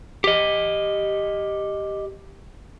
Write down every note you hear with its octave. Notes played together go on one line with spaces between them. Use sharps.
G4 D#5